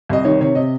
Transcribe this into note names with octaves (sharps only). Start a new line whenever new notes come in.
C2 D#5
D#3 C#5
C3 C#5
C3 D#5